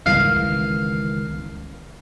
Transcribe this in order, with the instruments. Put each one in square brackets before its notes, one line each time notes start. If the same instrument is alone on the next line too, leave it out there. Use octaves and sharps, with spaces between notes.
[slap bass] C#2 D#3 E3 [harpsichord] F5